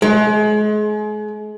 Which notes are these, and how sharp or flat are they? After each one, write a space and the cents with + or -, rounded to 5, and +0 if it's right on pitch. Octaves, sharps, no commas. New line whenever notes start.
G#3 +35